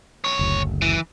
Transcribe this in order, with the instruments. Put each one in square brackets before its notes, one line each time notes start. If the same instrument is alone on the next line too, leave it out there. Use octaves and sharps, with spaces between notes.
[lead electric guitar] B1 C#5
[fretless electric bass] F#1 D2
[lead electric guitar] E3